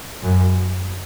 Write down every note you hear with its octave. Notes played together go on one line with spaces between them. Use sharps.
F#2